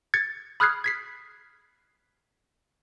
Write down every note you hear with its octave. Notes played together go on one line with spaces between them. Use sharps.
G#6 A6 C#7
B5 D#6 F6 F#6 G#6 C7
G#6 B6 C7